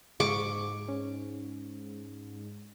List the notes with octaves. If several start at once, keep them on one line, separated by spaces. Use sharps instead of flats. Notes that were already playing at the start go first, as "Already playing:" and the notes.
G#2 G#3 C#6 D6
C#4